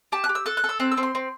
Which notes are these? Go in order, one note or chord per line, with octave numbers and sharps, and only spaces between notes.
G4 A5
F#6
G4
E6
A4 F#6
F#6
A4
E6
C4 F#6
E6
C4
C6
C4